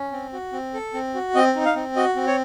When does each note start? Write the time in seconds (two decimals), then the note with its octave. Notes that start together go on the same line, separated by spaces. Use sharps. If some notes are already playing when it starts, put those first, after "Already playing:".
Already playing: C#4
0.12 C4
0.33 F#4
0.53 C4
0.74 A4
0.94 C4
1.15 F#4
1.35 C4 D#5
1.56 D#4
1.65 F5
1.76 C4
1.96 F#4 D#5
2.16 C4
2.27 C#5